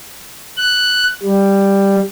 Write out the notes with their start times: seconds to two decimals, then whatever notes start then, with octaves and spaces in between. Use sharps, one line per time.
0.57 F#6
1.23 G3